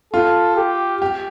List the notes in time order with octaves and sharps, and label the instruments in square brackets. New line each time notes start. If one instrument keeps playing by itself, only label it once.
[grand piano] F4 [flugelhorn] A4
[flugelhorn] G4
[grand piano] G4